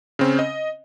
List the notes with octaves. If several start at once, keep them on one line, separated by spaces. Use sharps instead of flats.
C#3 C4 C#4
D#5